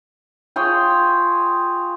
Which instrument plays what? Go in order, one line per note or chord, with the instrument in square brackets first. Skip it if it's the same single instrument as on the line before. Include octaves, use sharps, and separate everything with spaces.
[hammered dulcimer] F4 G#4 C#5 G5